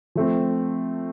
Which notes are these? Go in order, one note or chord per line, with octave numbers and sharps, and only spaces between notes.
F3 A3 C4